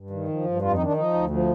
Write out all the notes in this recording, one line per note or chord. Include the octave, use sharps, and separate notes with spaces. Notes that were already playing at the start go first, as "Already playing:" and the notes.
Already playing: G2
D#3
F3
G2
F2 F4
D#4
D#3 D4
F3 D#4
D2
F3